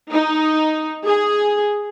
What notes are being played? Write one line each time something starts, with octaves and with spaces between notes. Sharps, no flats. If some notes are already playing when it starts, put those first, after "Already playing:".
D#4
G#4